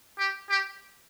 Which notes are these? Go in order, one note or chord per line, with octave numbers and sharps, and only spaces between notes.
G4
G4